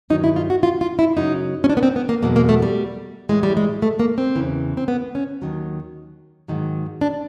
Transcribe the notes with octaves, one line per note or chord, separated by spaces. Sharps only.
G2 D#3 F#3 D#4
E4
F4
F#4
F4
F4
E4
F#2 C#3 F#3 D#4
C#4
D4
B3
C4
B3
A#3
E2 B2 F#3 A#3
A#3
A3
G3
A2 E3 G#3
G3
G#3
A3
A#3
C4
E2 C#3 E3
C4
B3
C#4
D#2 D#3 F#3
G#2 D#3 F#3
D4